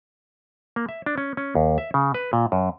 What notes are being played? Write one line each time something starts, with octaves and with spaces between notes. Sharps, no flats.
A#3
E5
D4
C#4
C#4
D#2
E5
C#3
B4
A#2
F#2